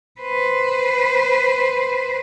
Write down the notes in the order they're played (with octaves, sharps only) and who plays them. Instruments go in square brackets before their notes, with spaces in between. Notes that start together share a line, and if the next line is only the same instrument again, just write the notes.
[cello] B4 C5